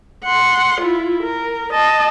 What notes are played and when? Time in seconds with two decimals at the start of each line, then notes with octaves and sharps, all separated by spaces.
0.25 F#5 C6
0.81 E4 F4
1.23 A#4
1.73 D#5 A5